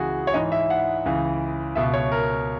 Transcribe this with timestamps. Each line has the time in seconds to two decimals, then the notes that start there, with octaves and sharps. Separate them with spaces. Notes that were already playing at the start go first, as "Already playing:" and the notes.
Already playing: C#2 C#3 E3 F#4 G#4
0.27 C#5
0.34 G#2 E3 D#5
0.52 E5
0.70 F#5
1.05 C#2 C#3 E3
1.75 C#2 B2 E5
1.93 C#5
2.12 A#4